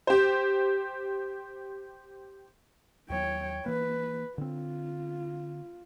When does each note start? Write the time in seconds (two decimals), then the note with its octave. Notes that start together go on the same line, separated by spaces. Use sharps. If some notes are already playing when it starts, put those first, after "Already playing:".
0.07 G4 C5
3.10 D#2 F#3 C#5 G5
3.66 E3 A#3 B4
4.38 D3 C4 F4